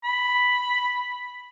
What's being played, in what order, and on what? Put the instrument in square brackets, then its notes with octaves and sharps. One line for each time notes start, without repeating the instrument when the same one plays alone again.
[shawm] B5